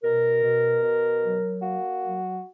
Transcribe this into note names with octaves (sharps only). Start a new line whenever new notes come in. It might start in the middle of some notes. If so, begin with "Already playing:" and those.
B2 A#4
B2
B2
F#3
A#3 F#4
F#3